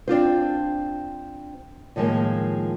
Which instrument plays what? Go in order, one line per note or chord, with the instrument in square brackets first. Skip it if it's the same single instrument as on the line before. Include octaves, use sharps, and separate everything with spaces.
[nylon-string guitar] C4 D4 F4 C5
A2 D#3 F3 G#3 A#3